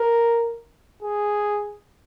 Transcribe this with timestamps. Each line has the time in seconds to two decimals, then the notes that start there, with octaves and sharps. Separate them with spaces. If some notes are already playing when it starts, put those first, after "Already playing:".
Already playing: A#4
1.03 G#4